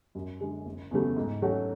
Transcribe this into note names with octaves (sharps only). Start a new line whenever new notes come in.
F#2
D3 G#3
F#1
E2 C#3 F#3 A3
G#2
F#3 A3 C#4 F#4